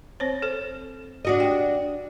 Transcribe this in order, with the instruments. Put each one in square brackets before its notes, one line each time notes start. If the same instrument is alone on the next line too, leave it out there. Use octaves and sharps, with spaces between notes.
[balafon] C4 C5 C#5
A4 C5
[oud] D4 F#4 D#5
[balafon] G4 G5